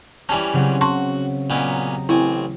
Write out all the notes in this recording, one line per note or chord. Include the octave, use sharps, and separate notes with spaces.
E3 G3 C#4 G#5 A5
C#3 F#3 C4
F#4 A5 C6 C#6
A#2 B3 C#4 G4 D#5 A#5
A1 C4 E4 G#5